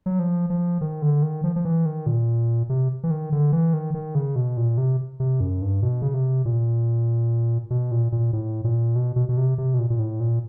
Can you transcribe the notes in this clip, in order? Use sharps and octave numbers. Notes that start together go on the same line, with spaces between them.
F#3
F3
F3
D#3
D3
D#3
F3
F3
E3
D#3
A#2
C3
E3
D#3
D3
E3
D#3
D#3
C#3
B2
A#2
C3
C3
F#2
G2
B2
C#3
C3
A#2
B2
A#2
A#2
A2
A#2
B2
B2
B2
C3
C3
B2
A#2
A#2
A2
A#2